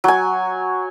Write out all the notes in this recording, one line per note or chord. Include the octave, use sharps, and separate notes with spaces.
F#3 G#5